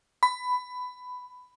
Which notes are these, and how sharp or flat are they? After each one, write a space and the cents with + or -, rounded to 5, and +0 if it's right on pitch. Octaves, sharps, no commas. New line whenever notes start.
B5 +15